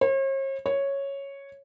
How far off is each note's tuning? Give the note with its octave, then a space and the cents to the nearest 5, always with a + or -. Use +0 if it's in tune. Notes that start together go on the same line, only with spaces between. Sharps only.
C#5 -45
C#5 -5